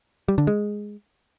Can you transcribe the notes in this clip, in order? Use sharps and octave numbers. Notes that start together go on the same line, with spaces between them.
G3
D3
G#3